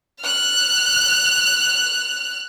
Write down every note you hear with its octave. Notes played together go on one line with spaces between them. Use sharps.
F6 F#6